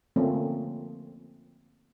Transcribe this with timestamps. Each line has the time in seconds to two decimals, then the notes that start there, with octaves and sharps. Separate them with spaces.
0.16 D3 F3 A3 A#3 C4 C#4